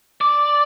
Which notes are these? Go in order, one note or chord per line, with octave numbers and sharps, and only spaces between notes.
D5